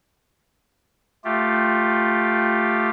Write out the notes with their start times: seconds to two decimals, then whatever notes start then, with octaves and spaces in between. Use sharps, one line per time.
1.25 A3 F4 G4